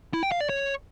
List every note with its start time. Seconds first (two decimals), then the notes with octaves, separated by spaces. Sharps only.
0.14 E4
0.23 G5
0.32 F5
0.41 D5
0.49 C#5